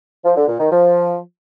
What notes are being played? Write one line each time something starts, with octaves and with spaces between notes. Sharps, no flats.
F3
D3
A#2
D#3
F3